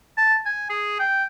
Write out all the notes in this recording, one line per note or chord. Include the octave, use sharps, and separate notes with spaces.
A5
G#5
G#4
G5